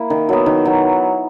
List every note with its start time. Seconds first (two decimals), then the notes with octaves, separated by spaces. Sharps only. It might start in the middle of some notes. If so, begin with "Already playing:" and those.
Already playing: A#3 E4
0.10 D#3
0.29 F#3 B3
0.46 D#3
0.65 F#3 B3